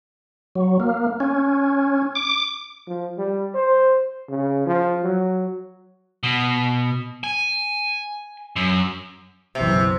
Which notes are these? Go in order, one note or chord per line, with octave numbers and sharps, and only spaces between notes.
F#3
A#3
C#4
D6
F3
G3
C5
C#3
F3
F#3
B2
G#5
F#2
F#1 B1 C3 E3